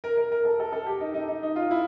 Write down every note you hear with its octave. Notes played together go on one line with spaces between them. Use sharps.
A#4
A#4
A#4
A4
A4
A4
G4
D#4
D#4
D#4
D#4
F4
E4